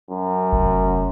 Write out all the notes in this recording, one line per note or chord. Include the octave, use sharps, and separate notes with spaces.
F#2
F1